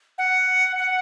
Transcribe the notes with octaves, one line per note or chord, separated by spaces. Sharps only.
F#5
F#5